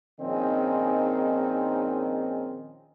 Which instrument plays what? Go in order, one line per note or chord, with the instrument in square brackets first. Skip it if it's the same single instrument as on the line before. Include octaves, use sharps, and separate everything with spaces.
[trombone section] A#1 D#3 C4 C#4 D#4 G#4